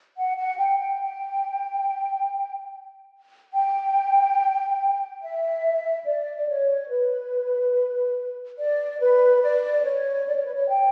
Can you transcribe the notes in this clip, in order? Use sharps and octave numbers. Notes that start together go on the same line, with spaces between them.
F#5
F#5
G5
G5
G5
G5
E5
D5
D5
C#5
B4
D5
B4
D5
C#5
D5
C#5
B4
C#5
G5